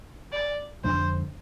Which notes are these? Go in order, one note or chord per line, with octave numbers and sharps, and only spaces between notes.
D5
F2 D3 G#3 D4 C5